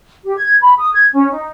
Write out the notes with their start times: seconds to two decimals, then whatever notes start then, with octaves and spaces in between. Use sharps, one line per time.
0.24 G4
0.38 G#6
0.61 B5
0.79 D#6
0.94 G#6
1.13 C#4
1.32 D#4